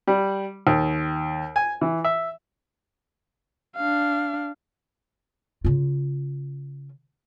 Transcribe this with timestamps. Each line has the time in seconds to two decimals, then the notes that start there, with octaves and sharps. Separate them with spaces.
0.07 G3
0.67 D#2
1.56 G#5
1.81 E3
2.04 E5
3.76 D4 F5
5.65 C#3 F4